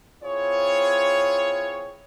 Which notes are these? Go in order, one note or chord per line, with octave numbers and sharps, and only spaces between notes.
C4 E4 F4 G#4 C#5